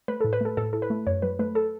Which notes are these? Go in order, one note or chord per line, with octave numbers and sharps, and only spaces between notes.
A3 B4
A4
A2
B4
A3 A4
A2 A4
E4 A4
B4
A3
F#2 C#5
F#3 B4
A3 B4
A4